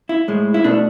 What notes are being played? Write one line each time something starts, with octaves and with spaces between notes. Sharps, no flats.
E4
A2 G#3
E4
B2 A3 D4